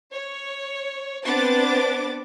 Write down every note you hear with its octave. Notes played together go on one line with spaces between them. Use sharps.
C#5
B3 C4 D4 B4 D6 A6